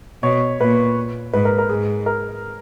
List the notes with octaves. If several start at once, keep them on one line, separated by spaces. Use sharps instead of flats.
B2 C#5
A#2 B4
G#2 B4
A#4
A#4
G#2 G#4
A#4